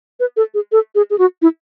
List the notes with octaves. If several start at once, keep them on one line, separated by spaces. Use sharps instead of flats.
B4
A4
G#4
A4
G#4
G#4
F#4
E4